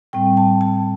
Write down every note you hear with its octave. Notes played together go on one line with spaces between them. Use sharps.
A2 G3 C4 G5
A5
A5